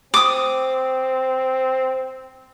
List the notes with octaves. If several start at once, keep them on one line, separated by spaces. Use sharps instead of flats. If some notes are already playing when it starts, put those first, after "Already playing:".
C4 D6 D#6